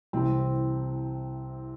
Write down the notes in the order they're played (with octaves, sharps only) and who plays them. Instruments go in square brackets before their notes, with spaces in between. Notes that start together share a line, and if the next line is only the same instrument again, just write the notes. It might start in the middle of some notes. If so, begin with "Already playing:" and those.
[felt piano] C2 C3 E3 C4